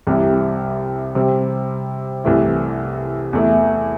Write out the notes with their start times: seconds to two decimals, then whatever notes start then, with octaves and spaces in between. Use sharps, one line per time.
0.07 C2 C3 G3 E4
1.15 C3 G3 C4
2.24 C2 C3 E3 A3 E4
3.33 E2 E3 A3 E4